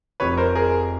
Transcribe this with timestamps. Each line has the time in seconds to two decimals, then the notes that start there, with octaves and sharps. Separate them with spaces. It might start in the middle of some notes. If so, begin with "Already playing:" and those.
0.20 F1 F2 C3 F3 B4 C#5
0.37 A#4 C5
0.55 G#4 A#4